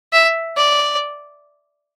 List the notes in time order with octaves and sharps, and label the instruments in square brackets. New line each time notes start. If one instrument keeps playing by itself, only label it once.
[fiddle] E5
D5